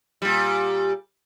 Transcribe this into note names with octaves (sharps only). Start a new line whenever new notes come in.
A#2 G3